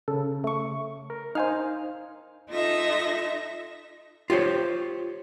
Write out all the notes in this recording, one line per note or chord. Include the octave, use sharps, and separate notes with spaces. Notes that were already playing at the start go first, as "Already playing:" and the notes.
C#3 A4
A3 C#6
A#4
D#4 C5 F5 G#5 F6
D#4 F4 A4 E5 A#6
F4 G4 C5 C#5